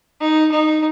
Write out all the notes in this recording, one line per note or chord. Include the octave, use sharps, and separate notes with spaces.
D#4
D#4